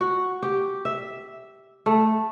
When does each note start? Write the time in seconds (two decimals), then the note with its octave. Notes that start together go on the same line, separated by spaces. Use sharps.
0.01 F#4
0.42 G4
0.85 E5
1.86 A3